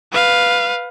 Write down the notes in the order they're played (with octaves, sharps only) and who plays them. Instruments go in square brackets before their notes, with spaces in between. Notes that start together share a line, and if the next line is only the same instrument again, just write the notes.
[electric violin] B4 F5